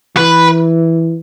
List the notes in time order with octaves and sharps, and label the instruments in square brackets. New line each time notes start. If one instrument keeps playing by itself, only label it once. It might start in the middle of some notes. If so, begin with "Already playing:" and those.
[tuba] E3 [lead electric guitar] B4